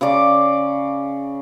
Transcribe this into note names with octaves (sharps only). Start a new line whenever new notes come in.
C#3 D5 D6